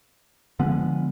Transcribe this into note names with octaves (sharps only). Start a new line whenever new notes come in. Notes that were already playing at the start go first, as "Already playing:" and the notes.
D3 F3 G#3 B3